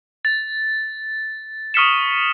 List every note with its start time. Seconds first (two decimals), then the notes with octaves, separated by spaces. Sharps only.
0.25 A6
1.74 C#6 D#6 F6 B6 C#7 E7